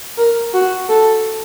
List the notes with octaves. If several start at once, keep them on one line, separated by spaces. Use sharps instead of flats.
A#4
F#4
A4